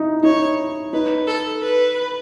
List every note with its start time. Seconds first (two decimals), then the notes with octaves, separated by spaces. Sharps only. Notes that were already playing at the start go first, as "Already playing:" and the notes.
Already playing: D#4 E4
0.23 D#4 C#5
0.93 D#4 B4
1.27 A4
1.62 B4